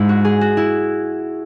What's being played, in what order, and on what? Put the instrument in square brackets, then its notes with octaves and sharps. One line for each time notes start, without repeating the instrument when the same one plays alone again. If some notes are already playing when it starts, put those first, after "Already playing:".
Already playing: [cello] G#2 [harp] E4
[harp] F#4
G#4
F#4
E4